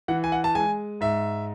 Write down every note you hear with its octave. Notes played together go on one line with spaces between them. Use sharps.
E3 F#5
G#5
F#5
A5
G#3 G#5
G#2 E5